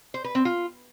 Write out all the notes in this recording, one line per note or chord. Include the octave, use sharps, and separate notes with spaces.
C5
B4
C4
F4